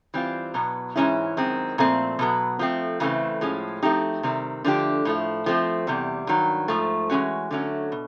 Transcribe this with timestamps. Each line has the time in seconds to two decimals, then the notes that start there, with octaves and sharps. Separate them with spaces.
0.14 E3 G3 C4 F4
0.54 B2 F#3 B3
0.95 G#2 E3 G#3 C#4 E4
1.37 F#2 D#3 G#3 C4
1.78 A#2 F3 A3 C4
2.19 B2 F#3 B3
2.59 F3 A3 C4
3.00 C#3 E3 A3 C4
3.41 A2 F3 G#3 C#4
3.82 F3 A3 C4 D#4 G4
4.23 C3 D#3 G3 C4
4.64 D3 F3 A3 D4 G4
5.05 A2 F3 A3
5.46 F3 A3 C4
5.87 E2 C3 G3
6.27 G2 D#3 F#3
6.68 G#2 F3 A3
7.10 E3 G#3 C#4 F#4
7.50 D3 F#3 A3 C#4
7.92 B2